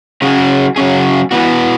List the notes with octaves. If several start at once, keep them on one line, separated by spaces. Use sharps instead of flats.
C#3 F#3 C#4 G#4
C#3 F#3 C#4 G#4
E3 B3 F#4